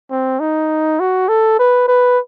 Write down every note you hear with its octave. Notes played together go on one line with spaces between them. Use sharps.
C4
D#4
F#4
A4
B4
B4